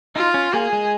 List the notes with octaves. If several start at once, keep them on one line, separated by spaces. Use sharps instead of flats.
D#4 F4
C#4
A#3 G#4
G#3